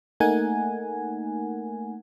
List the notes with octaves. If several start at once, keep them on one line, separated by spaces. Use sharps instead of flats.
A3 A#3 D#4 A#4 F#5 G#5